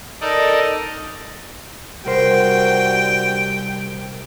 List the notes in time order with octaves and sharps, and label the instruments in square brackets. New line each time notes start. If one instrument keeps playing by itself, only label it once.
[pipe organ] D#4 A4 A#4 D5 D#5
[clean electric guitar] C2 A#4 C5 [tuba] G3 [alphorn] F#4 [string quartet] G5